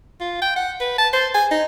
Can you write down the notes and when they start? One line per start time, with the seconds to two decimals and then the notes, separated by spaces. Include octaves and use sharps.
0.21 F4
0.42 G5
0.56 F#5
0.80 B4
0.98 A5
1.13 C5
1.35 G#5
1.51 D#4